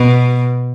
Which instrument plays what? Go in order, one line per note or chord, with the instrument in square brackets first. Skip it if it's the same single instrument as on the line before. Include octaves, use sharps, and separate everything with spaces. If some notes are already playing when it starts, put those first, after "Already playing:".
Already playing: [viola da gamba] B2